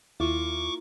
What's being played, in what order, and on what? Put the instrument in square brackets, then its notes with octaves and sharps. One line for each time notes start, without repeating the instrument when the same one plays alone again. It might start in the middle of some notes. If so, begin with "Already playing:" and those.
[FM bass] D#2 [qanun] A#3 F4 [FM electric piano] E4 [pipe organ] C#6 D6